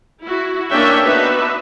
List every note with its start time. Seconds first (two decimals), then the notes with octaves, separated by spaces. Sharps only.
0.23 E4 F#4
0.70 A#3 C#4 D4 C#5 E5 G5
1.04 B3 D4 D#4 F#4 B4 E5